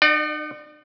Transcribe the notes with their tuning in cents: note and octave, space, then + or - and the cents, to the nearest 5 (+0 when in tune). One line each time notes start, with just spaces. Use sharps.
D#4 -40 D5 +30 F#5 +0